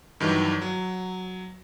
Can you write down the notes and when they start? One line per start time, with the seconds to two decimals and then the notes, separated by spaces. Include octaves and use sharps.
0.20 G2 D#3 E3 F#3
0.61 F#3